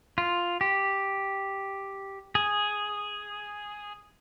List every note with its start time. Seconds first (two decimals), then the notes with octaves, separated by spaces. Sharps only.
0.18 F4
0.61 G4
2.35 G#4